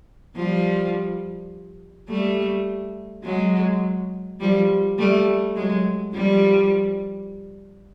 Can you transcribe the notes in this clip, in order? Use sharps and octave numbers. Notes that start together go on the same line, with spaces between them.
F3 G3
G3 A3
F#3 G#3
F3 G3
G3 A3
F#3 G#3
F3 G3